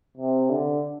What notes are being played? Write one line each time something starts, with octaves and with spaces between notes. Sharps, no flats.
C3
D3